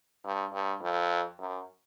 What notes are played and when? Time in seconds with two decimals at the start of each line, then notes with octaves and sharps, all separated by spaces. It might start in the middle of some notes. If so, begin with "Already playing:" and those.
0.25 G2
0.53 G2
0.81 F2
1.39 F#2